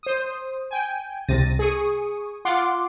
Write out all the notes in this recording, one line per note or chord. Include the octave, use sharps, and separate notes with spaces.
C5 D#6
G5 G#5
C2 C3 A6 A#6 D#7
G#4 C#6 D#6
F4 F#5 C6 D6